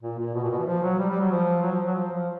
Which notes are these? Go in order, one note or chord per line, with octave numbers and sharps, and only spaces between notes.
A#2
A#2
B2
A#2
B2
E3
F3
F#3
G3
G3
F#3
F3
F#3
F3
F#3
F3
F3